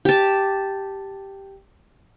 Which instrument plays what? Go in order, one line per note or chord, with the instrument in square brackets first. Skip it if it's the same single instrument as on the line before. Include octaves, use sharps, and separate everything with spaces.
[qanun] G4 A5